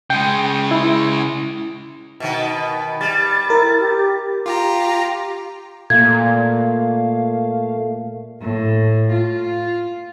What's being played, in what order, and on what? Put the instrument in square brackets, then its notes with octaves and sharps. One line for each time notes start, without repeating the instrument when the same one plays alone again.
[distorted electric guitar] C#3 G#3 [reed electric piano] G5
[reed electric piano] E4
[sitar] B2 D#3 B3
[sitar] G3 [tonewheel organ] A6
[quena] E4 [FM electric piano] A#4
[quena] G4
[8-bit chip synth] F4 G4 A#5
[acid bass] A#2 [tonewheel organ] A3 [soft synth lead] F5 [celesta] G#6
[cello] A2
F4